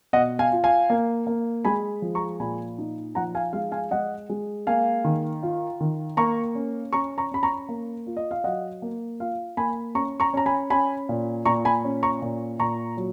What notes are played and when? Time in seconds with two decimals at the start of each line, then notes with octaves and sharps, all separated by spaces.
0.13 B2 D#5 F#5
0.39 F5 G#5
0.52 F4
0.64 F5 G#5
0.90 A#3
1.27 A#3
1.65 G#3 G#5 B5
2.02 F3
2.15 A#5 C#6
2.40 A#2 G#5 B5
2.78 D#4
3.15 F3 F#5 A#5
3.35 F5 G#5
3.53 G#3 F5
3.72 F5 G#5
3.91 G#3 D#5 F#5
4.30 G#3
4.67 A#3 F5 G#5
5.05 D#3
5.43 F4
5.81 D#3
6.17 A#3 A#5 C#6
6.55 C#4
6.93 C#4 A#5 C#6
7.18 A#5 C#6
7.31 C#4 B5
7.43 A#5 C#6
7.69 A#3
8.06 F4
8.17 D#5
8.31 F5
8.44 F#3 D#5 F#5
8.82 A#3
9.20 F4 F5
9.57 A#3 G#5 B5
9.95 C#4 A#5 C#6
10.20 A#5 C#6
10.33 C#4 A#5
10.46 G#5 B5
10.70 C#4 G#5 B5
11.09 A#2
11.45 A#2 A#5 C#6
11.65 G#5 B5
11.84 C#4
12.03 A#5 C#6
12.22 A#2
12.59 A#2 A#5 C#6
12.97 F#3